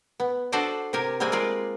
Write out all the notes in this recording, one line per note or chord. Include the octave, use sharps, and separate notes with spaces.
B3
D4 F#4 A4 C5 D5 D#5
C3 G4 A#4 G#5
G3 G#3 A#3 C4 G#5
G#3 F4 A#4 D5